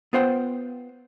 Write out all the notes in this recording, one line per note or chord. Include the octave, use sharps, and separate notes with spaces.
B3 F4 C5 F#5 G5